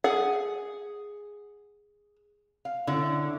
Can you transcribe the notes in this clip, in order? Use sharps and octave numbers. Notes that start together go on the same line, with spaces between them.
G#4 F#5
F5
D3 C#4 E4